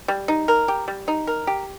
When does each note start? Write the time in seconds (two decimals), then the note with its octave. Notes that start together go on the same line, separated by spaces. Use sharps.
0.08 G3
0.28 D#4
0.48 A#4
0.68 G4
0.88 G3
1.08 D#4
1.27 A#4
1.47 G4